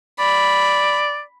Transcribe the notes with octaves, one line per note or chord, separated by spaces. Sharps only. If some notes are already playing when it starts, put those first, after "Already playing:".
D5 B5